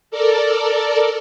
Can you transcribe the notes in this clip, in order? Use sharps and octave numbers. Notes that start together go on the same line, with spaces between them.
A4 A#4 D5